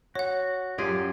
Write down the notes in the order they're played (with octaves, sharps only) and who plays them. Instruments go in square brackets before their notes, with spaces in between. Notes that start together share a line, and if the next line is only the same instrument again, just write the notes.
[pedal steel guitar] F#4 [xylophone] C#5 F#5
[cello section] F#2 [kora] F4 G4 G#4